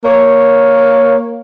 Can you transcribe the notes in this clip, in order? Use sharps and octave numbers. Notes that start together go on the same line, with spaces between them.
A#3 C#5